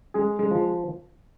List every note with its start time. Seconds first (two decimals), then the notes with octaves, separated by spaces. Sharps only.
0.14 G#3 G#4
0.39 G#3
0.51 F3